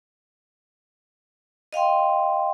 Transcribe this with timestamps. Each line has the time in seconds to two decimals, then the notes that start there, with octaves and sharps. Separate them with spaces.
1.73 D#5 F5 G5 C6